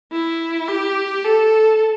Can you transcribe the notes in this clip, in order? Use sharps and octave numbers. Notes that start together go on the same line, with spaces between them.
E4
G4
A4